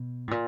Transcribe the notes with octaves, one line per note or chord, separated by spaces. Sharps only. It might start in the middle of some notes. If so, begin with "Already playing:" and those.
Already playing: B2
A2
A#2